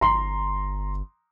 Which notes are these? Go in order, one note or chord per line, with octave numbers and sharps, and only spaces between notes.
G1 A#5 C6